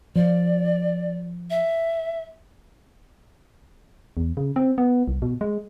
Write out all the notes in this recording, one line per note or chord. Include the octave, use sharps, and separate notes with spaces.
F3 D5
E5
E2
C#3
C4
B3
C2
B2
G#3